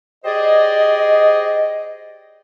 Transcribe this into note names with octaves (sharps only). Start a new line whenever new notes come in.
G4 G#4 C5 D5 D#5